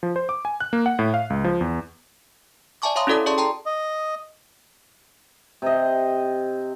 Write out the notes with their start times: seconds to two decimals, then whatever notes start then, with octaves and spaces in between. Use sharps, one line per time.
0.03 F3
0.16 C5
0.29 D6
0.45 G#5
0.60 F#6
0.73 A#3
0.86 F#5
0.99 A2
1.14 F5
1.30 C#2
1.44 F3
1.61 E2
2.82 D5 E5 G#5 A5 C#6 D6
2.96 C#5 E5 F5 A#5 C6 D#6
3.07 C#4 E4 F#4 A4 D5 D#6
3.26 G#4 D5 A5 C6 C#6
3.38 G5 A5 A#5 C6
3.66 D#5
5.62 C3 D#5